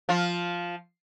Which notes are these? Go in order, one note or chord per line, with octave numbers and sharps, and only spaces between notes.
F3 F4